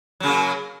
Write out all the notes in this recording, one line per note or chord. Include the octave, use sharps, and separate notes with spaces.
C#3 F#3 A#3